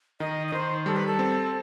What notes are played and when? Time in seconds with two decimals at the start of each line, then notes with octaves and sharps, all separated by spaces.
0.20 D#3 D#5
0.48 D#5
0.52 D#3 C5
0.86 G3 A4
0.96 B4
1.07 A4
1.19 C4